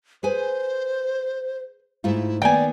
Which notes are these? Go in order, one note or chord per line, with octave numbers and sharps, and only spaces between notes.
G#4 B4 C5 G#5
G#2 A3 E4 F4
D#3 A#3 B3 D5 G5 G#5